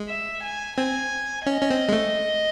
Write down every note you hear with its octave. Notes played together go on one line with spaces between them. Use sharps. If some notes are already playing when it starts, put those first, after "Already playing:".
Already playing: G#3
E5
G#5
C4 G#5
C#4 D#5
C#4
C4
G#3
A3